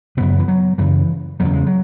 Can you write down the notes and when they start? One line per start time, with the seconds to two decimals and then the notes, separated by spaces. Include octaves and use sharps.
0.17 F#2 C#3 B3
0.39 E3
0.48 F#3
0.78 F#2 C#3 E3
1.40 E2 C#3 F#3
1.53 G#3
1.67 F#3